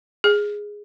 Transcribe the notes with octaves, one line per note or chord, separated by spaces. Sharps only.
G#4